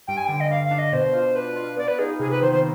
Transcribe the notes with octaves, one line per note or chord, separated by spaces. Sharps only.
G2 G5
G#5
D3 G5
D#5
G2 F5
F5
D4
D#5
B2 C5
F4
D4 B4
F4
B3 D5
B4
D#4 G#4
C3 G#4
B4
D#3 C5
C5